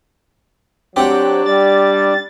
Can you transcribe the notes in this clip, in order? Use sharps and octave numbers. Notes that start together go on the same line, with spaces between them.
F#3 C4 D4 G4 F#5 G5
G3 A6